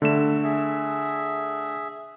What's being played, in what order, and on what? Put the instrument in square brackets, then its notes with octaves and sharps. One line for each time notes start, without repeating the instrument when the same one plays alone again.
[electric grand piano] D3 A3 E7 [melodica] G3 E5
[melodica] G#4 E5